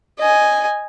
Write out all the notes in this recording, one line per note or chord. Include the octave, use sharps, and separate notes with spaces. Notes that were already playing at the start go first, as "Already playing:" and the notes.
D#5 G#5